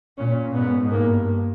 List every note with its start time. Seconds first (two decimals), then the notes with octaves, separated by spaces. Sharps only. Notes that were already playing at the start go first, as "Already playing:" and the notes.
0.18 A#2 C#4
0.54 G#2 B3
0.90 G2 A#3